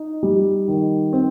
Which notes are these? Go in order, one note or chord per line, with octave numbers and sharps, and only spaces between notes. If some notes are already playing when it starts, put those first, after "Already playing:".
Already playing: D#4
G3
D#3
C4